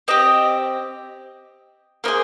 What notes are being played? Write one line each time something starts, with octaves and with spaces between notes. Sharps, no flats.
C4 G4 D#5
A#3 D#4 G#4 C5